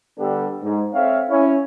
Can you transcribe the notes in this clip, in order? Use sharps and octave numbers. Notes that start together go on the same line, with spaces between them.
D3 G3 B3 D4 G4 A4
G#2
C4 A4 C#5 E5 F5
C#4 E4 C#5